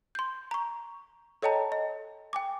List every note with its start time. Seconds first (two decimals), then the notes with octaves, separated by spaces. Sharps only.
0.15 C6 G6
0.51 A#5 C#6
1.42 A4 C#5 D#5 G5 A5 A#5
1.72 D#5
2.33 G5 G#5 D6